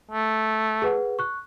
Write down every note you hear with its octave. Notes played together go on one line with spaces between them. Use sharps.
A3
G#4 B4 F#5
C#6 F#6